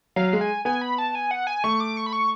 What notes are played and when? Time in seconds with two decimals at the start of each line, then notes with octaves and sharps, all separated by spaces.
0.16 F#3 F5
0.33 G#3
0.41 G#5
0.65 B3 G#5
0.82 B5
0.98 A5
1.15 G#5
1.31 F#5
1.47 G#5
1.64 A3 C#6
1.80 D6
1.97 C#6
2.06 B5
2.13 C#6